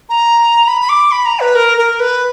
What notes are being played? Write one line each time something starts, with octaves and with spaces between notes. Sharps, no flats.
A#5
B5
B5
D6
B5
A#5
B4
A#4
A#4
B4